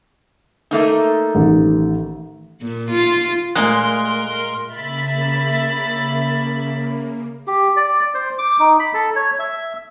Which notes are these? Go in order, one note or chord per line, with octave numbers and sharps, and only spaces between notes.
A3 A#3 D#4
A1 D#3
A#2
F4
A#2 G#3 A3 A#4 C6 F#6
C#3 A#3 E5 B5 A6
G4
D5
C5
D6
D#4
B5
A4
C#5
E5